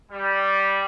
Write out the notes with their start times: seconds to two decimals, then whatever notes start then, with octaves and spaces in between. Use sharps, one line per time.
0.12 G3